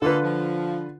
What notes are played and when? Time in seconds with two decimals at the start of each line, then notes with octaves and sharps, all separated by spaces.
0.02 D3 G#3 A#3 F4 A4 B4
0.23 F3